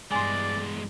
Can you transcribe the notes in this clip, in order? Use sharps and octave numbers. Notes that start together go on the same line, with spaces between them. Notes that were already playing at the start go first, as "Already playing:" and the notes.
E2 G2 G#3 D5 G#5 C6